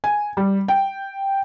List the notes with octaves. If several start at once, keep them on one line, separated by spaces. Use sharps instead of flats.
G#5
G3
G5